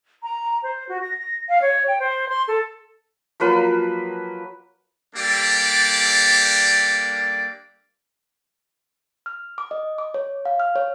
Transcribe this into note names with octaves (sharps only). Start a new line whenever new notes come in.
A#5
C5
F#4
A#6
F5
C#5
G5
C5
C6
A4
F3 F#3 A#3 B4
G3 A#3 D4 G4 A4 D5
F6
D6
D#5
D6
C#5
F5
F6
C#5